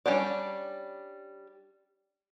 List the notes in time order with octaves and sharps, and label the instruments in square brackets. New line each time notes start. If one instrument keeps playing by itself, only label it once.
[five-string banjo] G3 C#4 D4 D5